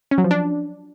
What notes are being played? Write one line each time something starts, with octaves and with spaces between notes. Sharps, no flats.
C#4
F#3
F3
D4